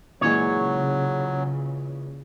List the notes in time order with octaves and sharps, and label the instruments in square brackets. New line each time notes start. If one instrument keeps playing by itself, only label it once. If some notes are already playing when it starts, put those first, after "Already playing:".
[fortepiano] A#2 E3 G#3 [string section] C#3 [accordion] F#3 [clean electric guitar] C#5